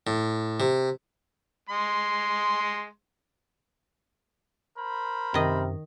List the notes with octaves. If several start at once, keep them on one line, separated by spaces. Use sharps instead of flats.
A2
C3
G#3 C6
A#4 C5 B5
F#2 C3 D#3 D#5